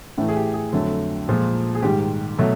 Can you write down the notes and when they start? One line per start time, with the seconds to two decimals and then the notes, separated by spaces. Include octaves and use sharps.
0.18 A2 E3 A3
0.28 G#4
0.36 G4
0.54 G#4
0.72 F2 D3 F#3 A3 A4
1.27 A#2 F3 G#3
1.75 G#4
1.82 G#2 D#3 G3 G4
2.38 B2 F#3 A3